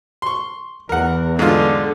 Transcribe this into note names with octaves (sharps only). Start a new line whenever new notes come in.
C6 C#6
E2 A#4 F#5
G#2 D3 F#3 F4